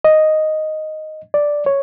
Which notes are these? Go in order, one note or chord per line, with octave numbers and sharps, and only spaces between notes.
D#5
D5
C#5